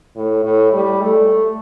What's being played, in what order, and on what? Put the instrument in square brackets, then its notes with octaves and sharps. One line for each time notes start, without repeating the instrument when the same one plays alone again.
[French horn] A2
A2
G3
A3